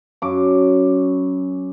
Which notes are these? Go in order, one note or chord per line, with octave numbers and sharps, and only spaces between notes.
F#2 D6